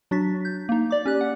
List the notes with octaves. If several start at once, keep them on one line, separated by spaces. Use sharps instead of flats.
F#3 D4 F#4 A6 B6
G6
A#3 D#4
D5 D6
C#4 G4 F#6
F#5